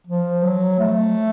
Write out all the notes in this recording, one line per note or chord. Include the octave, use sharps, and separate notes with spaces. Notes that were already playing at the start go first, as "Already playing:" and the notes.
F3
F#3
A3